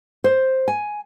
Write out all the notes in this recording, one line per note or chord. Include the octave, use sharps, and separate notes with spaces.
C5
G#5